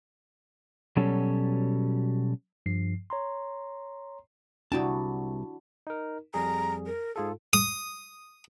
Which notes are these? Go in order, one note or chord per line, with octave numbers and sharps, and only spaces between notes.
B2 F#3 G3 C#4 A4
G2 F3 C7
C#5 A#5 C6
C2 D4 E4 F#4 G5 A5
D#4 A#4
F2 G3 G#4 A#5
A#4
G#2 F4 G#4 A4
D#6